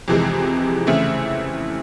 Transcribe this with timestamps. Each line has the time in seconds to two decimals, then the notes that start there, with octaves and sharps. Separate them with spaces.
0.08 F2 C3 E3 G#3
0.87 C#3 E3 A3 C4 E4